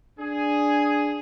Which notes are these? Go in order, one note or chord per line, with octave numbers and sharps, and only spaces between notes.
D4 G#4